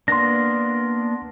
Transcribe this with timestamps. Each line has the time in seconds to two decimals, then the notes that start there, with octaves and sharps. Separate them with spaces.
0.08 A#3 B3 D4 C6 A#6